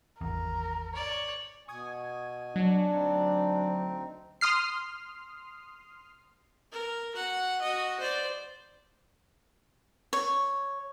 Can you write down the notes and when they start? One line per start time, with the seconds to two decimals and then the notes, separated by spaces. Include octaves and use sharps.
0.21 G#1 E2 A#4
0.94 C#5 D5
1.68 B2 G#5 C#6 D#6 G#6
2.56 F#3 D4
2.91 D2 C4 D#4
4.41 C6 D#6 F6 C7
6.72 A#4
7.15 F#4 F#5
7.62 F#4 D#5
8.00 C5 D5
10.13 C#5